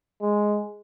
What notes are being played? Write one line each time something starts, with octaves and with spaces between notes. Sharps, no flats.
G#3